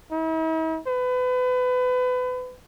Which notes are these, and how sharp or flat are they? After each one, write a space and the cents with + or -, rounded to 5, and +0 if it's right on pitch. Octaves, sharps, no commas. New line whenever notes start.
E4 -45
B4 +30